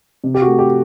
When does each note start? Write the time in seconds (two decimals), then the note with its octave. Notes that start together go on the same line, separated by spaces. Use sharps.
0.24 C3
0.34 G4
0.42 F#4
0.47 A3
0.59 G4